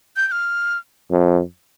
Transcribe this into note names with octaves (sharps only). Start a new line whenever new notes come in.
G6
G6
F6
F2